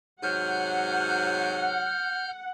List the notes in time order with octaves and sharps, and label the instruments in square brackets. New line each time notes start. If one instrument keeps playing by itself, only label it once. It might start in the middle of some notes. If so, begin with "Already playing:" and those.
[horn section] G#2 C3 F#3 [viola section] F#5 [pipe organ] F6 G6